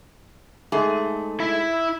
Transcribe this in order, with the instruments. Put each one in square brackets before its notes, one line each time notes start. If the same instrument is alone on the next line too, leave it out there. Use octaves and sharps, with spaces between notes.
[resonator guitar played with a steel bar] G#2 A3 G#4
[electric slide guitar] E4 E5